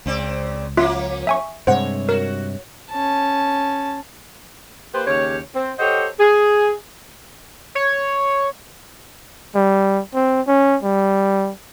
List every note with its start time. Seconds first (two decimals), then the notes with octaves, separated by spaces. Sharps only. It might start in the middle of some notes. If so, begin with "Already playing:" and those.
0.06 C#2 C#3 C4 D5
0.77 F3 A#3 C#4 F4 E5
1.27 E5 G#5 C#6
1.67 G2 C3 G#3 C5 C#5 F#5
2.09 F#4 A#4
2.91 C#4 A5
4.94 A#3 G4 B4 C5
5.07 D#2 C#3 G4 C#5
5.55 C4
5.79 G4 A4 C5 C#5 D#5 F#5
6.19 G#4
7.75 C#5
9.55 G3
10.14 C4
10.47 C#4
10.83 G3